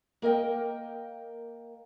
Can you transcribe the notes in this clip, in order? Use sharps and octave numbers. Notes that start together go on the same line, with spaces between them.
A#3 A#4 D#5 G5